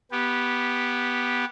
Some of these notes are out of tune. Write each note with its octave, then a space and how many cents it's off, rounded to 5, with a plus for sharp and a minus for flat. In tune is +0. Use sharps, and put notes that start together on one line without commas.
B3 -10 G4 +0